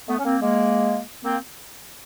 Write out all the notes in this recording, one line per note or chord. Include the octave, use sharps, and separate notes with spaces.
A3 B3
C#4
A#3 C4
G#3 A#3
A#3 C4